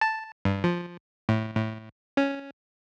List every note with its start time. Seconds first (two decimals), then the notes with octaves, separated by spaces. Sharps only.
0.01 A5
0.45 G2
0.64 F3
1.29 A2
1.56 A2
2.17 C#4